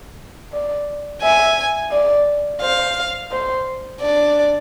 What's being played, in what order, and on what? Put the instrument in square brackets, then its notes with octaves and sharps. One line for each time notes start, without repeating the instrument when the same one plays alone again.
[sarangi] D5
[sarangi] E5 [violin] G#5
[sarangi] D5
[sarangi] C5 [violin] F5
[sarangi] C5
[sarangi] D4 [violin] D5